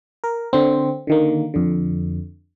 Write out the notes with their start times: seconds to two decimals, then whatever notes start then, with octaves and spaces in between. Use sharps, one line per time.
0.24 A#4
0.53 D3 C4
1.07 D3 D#3 A#3
1.54 F2 D3